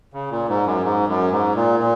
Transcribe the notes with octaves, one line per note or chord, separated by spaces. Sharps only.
C#3
A#2
G#2
F#2
G#2
F#2
G#2
A#2
A#2